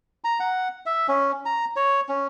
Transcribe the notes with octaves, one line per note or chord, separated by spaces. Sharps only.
A#5
F#5
E5
C#4
A#5
C#5
C#4